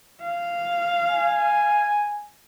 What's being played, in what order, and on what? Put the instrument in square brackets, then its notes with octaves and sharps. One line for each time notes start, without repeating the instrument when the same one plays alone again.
[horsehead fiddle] F5
[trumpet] G#5